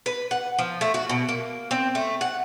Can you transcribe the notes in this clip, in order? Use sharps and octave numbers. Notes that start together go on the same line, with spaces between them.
B4
F#5
F3
A3
F#4
B2
A#3
C4
A3
F#5